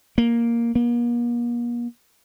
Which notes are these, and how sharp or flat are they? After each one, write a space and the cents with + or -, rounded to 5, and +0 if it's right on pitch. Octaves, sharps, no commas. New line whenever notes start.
A#3 +5
A#3 +40